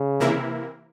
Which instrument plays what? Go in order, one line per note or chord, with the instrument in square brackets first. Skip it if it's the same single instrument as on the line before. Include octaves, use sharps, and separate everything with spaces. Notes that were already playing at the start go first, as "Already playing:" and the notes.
Already playing: [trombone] C#3
[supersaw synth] C3 E3 A#3 E4 A#4